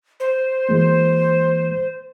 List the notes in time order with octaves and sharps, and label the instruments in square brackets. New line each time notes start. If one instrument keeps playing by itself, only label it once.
[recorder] C5
[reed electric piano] E3 G#3 A#3